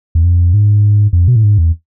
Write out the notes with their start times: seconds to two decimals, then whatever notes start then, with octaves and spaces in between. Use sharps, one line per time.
0.15 E2
0.24 F2
0.54 G#2
1.13 F2
1.28 B2
1.36 A2
1.44 G#2
1.58 E2